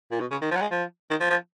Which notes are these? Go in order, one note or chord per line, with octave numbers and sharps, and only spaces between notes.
A#2
B2
C#3
D#3
F3
F#3
G#3
F3
D#3
F3
F3